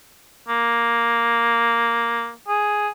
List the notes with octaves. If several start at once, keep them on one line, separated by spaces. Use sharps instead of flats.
A#3
G#4